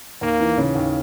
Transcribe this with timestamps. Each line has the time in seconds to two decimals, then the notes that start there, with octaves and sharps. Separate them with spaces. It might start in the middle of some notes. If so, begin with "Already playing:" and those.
0.21 D#2 A#3
0.40 E3
0.58 C#3
0.75 D#2